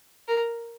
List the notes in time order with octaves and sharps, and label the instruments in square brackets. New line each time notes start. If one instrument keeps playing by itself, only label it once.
[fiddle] A#4